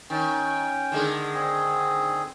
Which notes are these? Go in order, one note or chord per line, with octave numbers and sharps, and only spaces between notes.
D#3 C#4 G5
D3 D#3 G#3
C4 G#4